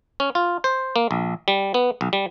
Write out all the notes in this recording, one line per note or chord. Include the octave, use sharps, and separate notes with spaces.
C#4
F4
C5
A#3
A#1
G3
B3
B1
G3